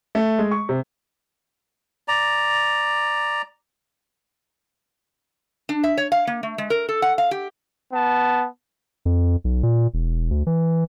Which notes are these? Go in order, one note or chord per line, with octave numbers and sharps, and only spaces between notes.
A3
G#3
C#6
C3
D5 A#5
D4
E5
C#5
F5
A#3
A3
G#3
A#4
A4
F#5
F5
G4
B3 A5
F2
B1
A#2
E1
D2
E3